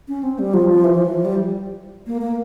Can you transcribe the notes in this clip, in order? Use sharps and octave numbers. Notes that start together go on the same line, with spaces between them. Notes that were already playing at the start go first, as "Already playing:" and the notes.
C#4
C4
G3
F3
F3
E3
F3
E3
F3
G3
A#3
A#3